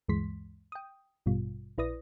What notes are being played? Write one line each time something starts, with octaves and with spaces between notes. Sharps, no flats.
D2 G2 E3 G#3 C6 B6
G5 D#6
A1 G2 B2 G3 F4
A#1 E4 B4 D5 D#6 A#6